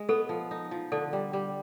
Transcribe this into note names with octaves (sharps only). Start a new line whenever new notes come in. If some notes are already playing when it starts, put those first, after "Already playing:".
Already playing: G#3
B3 A4
F3
D#4
F3
D3 A4
G3
G3